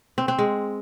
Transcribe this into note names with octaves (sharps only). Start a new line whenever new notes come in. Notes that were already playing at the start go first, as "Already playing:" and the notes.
C4
C4
G#3